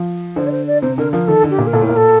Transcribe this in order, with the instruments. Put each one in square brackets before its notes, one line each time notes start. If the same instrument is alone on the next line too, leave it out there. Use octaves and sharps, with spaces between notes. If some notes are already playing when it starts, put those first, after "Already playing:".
Already playing: [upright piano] F3
[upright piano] D3 [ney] C5
[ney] D5
C5
D5
[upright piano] C3 [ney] C5
[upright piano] D3 [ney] A#4
[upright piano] F3 [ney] A#4
[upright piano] D#3 [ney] A4
[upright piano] D3
[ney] G4
[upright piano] A#2
[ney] A#4
[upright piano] A#2 [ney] A4
[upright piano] A2
[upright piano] A#2 [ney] A#4
[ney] A4